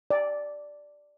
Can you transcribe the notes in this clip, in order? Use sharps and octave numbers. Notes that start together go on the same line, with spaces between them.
D5